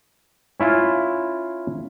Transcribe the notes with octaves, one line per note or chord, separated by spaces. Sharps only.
C#4 E4 F4